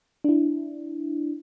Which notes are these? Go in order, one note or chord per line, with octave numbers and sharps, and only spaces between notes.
D4 E4